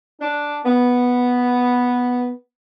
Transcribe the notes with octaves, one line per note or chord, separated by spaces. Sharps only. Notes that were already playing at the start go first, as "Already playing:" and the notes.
D4
B3